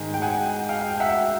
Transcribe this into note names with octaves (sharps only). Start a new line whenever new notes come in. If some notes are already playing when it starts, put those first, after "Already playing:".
Already playing: G#2 D#3 G#3 G#5 A#5
G5
F#5 G#5
F5 G5
G5
E5 F#5